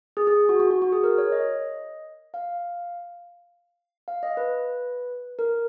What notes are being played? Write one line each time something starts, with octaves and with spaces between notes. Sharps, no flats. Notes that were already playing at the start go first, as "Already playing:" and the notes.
G#4
G#4
F#4
F#4
F#4
F#4
G#4
A#4
C#5
D#5
F5
F5
D#5
B4
A#4